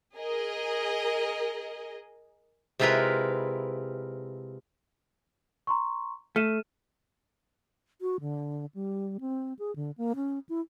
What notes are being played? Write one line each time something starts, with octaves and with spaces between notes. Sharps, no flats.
G#4 A#4 D#5
C3 G#3 E4 F4 A#4 B4
A#5 C6 C#6
A3 F6 D#7 E7
F#4
D3
G3
C4
G#4
D3
A#3
C#4
E4